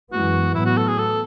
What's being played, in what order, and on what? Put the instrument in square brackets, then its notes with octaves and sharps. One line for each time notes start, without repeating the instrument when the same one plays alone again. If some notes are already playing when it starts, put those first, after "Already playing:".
[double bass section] F#2 E3 G#3 B3 [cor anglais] F#4
[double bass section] A2 F#3 B3 [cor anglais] E4
[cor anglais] F#4
A4
G#4
A4